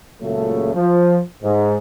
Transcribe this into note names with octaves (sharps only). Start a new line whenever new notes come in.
C#2 A#2 C#3 F#3 A3
F3
G#2